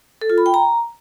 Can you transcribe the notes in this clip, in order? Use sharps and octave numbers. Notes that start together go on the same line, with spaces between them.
A4
F4
B5
G5
A#5